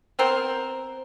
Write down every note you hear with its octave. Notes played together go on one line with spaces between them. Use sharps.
B3 C4 A#4 C5